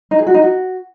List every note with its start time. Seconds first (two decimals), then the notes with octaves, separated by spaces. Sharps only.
0.11 D#4
0.19 G#4
0.27 F#4
0.34 D#4
0.42 F#4